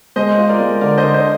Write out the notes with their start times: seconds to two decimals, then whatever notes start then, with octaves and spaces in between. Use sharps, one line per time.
0.16 G#3 C5 D#5
0.38 F4
0.49 A#4 D5
0.60 G#3
0.81 D3 A#4 D5
0.98 C5 D#5
1.03 D3
1.14 C5 D#5